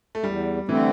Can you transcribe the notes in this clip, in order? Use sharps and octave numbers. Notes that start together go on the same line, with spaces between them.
A3
E2 G3
D3 E3 A3 C4